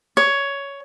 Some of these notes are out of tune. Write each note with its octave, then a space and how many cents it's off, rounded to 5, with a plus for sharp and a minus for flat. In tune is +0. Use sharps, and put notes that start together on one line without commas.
C#5 +10